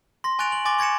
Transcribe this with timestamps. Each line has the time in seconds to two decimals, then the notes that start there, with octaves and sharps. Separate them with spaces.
0.24 C6 A#6
0.39 G#5 C#6 F#6 A6 D7 F7
0.52 F#7
0.65 G#5 C6 D6 A6 A#6 G7
0.79 C#6 G#6 A#6 C#7 E7